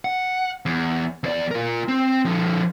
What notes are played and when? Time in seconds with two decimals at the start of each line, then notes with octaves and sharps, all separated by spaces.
0.05 F#5
0.66 E2
1.24 E2 D5
1.51 F4 A#4
1.88 C4
2.25 D3 F3